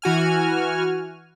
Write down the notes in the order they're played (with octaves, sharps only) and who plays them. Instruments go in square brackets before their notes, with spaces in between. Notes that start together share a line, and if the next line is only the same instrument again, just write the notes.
[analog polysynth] E3 F#4 G#5 F6